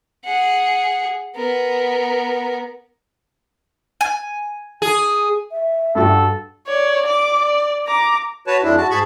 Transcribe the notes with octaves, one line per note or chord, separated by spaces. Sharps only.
G#4 F#5
B3 A#4
G#5
G#4
E5
G2 F#4 A4 G5
C#5 D5
D5 D6
D5
A#5 D6
F#4 B4 C#5 A5
F2 G#3 D4 E4
F#4 A5
G#2 G#4 A5 B5 C#6